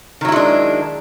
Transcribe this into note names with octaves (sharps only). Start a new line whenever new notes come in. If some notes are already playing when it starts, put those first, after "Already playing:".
D#3 F#3 G#3 D4 E4